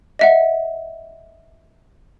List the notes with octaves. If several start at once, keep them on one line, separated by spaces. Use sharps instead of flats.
D#5 E5 F#5